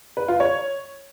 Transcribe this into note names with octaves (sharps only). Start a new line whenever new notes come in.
B4
F4
C#5